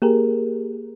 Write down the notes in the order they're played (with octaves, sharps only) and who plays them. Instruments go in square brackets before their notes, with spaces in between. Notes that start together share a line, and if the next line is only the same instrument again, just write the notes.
[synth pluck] A#3 G4 G#4 A#4